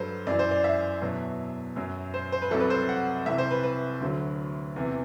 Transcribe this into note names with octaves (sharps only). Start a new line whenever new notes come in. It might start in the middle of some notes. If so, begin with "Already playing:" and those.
Already playing: G2 F#3 A4 B4 C5
F#2 E3 D5
C5
D5
E5
E2 B2 F#3
F#2 F#3
C5
C5
B4
C2 C3 F#3 A4
B4
C5
F#5
C2 C3 E3 E5
C5
B4
B4
D2 D3 F#3
E2 C3 E3